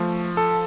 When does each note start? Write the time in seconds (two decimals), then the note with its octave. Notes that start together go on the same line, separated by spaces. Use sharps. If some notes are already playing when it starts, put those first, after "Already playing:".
Already playing: F3 A3
0.37 A4